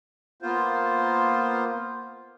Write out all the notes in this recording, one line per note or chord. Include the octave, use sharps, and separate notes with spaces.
A#3 B3 F4 C5